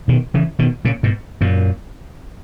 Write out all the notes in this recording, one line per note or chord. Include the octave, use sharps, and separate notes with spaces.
B2 D#3
C#3 E3
B2 D#3
A#2 C#3
G#2 B2
F#2 A#2